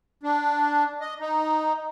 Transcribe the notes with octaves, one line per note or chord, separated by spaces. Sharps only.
D4
D#5
D#4